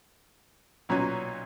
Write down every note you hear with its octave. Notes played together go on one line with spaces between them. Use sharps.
B1 A#2 F#3 C#4